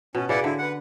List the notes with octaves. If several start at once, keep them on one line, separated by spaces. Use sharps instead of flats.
B2 C#4
C#3 E4 B4 D5 F#5
D3 E4
B4 F#5